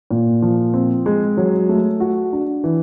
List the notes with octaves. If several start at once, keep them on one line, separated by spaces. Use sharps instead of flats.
A#2
F3
C4
G#3
F#3
A3
F#4
D4
E3